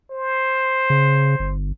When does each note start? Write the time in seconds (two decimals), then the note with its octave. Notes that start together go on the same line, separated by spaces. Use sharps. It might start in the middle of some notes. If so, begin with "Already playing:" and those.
0.11 C5
0.90 C#3
1.39 G1